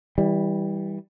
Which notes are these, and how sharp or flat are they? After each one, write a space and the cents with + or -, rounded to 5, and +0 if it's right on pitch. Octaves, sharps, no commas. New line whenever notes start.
E3 -25 G3 +0